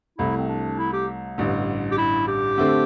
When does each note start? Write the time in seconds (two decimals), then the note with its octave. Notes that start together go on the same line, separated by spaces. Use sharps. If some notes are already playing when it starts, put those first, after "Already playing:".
0.18 C2 C3 A3 E4
0.37 C4
0.48 D4
0.79 E4
0.93 G4
1.38 A1 G2 D3
1.91 G4
1.98 E4
2.28 G4
2.58 D3 A3 C4